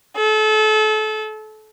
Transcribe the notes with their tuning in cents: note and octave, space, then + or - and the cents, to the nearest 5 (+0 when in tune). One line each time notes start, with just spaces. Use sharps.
A4 -30